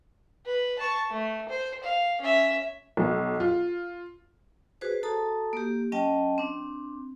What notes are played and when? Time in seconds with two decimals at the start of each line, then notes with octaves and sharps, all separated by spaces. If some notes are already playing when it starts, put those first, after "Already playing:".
0.46 B4
0.79 A5 C#6
1.10 A3
1.49 C5
1.84 F5
2.21 C#4 E5
2.97 B1
3.40 F4
4.81 F#4 G#4 B4 C5
5.03 F#4 A4 A5 A#5 D#6
5.53 A#3 G4
5.92 F#3 C#4 D#5 G5 A5
6.38 C4 D4